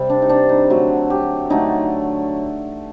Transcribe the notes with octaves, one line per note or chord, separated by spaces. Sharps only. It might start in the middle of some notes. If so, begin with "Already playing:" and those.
Already playing: C3 G3 C4
D4
D#4
D4
D#4
D3 F#3 A3 F#4
G4
D3 F#3 A3 D#4